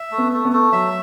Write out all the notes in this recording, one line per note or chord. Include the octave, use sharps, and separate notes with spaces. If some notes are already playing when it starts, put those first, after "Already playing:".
Already playing: E5
A3
B3
A3
B3
A3
F#3 E5